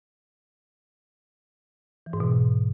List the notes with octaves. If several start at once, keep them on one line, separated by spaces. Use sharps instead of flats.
E3
G#2
B2